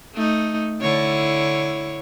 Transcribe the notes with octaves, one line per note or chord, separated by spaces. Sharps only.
A3 D#4
D3 E4 C#5